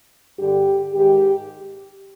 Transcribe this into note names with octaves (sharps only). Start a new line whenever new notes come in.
G2 D3 G4
G#2 D#3 G4